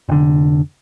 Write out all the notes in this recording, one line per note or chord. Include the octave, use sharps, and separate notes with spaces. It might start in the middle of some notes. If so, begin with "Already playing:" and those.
F1 D3